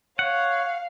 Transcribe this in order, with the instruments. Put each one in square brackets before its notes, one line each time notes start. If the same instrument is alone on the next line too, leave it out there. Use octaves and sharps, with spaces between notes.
[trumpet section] C#5 [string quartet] F5 [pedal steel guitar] F#5